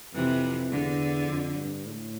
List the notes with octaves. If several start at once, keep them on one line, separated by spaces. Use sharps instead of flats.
F2 C3 E3
E2 D3
F2
G2
A2